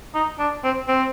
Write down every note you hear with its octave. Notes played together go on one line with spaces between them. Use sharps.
D#4
D4
C4
C4